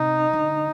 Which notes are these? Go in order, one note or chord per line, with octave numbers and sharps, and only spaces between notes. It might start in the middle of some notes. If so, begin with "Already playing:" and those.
Already playing: C3 D#4
D3